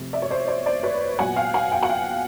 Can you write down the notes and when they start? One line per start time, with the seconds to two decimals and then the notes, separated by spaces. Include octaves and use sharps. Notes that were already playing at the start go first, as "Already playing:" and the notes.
Already playing: C3 F3 A3
0.13 D5 E5
0.22 C#5
0.31 C5 D5
0.48 C5 D5
0.66 C5 D5
0.83 B4 C#5
1.19 A#2 F#3 B3 F#5 G#5
1.36 F5 G5
1.54 F#5 G#5
1.72 F5 G5
1.83 F#5
1.89 F5 G5